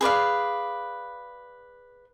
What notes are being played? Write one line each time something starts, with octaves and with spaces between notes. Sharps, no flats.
G#4 B4 D5 F5